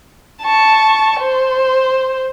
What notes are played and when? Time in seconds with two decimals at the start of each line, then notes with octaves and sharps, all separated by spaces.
0.42 A5 C#6
1.20 C5